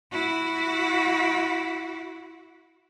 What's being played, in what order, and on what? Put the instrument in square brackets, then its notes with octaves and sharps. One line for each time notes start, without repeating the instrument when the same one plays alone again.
[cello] E4 F#4